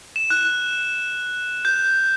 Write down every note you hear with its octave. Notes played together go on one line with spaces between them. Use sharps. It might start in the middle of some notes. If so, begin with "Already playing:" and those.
E7
F#6
G6